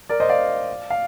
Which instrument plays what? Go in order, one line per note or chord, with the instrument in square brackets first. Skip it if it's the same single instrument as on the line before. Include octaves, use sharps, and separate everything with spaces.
[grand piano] A#4 D5
C5 D#5
D5 F5
F5